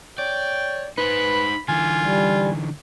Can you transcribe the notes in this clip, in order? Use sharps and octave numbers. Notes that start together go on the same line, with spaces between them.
C#5 D5 G5
D#4 B4 C5 B5
D3 E3 F4 G#5
G3